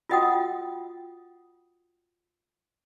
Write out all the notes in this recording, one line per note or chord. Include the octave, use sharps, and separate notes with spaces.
F4 F#4 D#5 F#5 G5 D#6